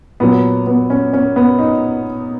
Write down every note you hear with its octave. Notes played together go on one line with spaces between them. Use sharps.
A#2 F#3 B3
B3
C#4
C#4
B3
D#4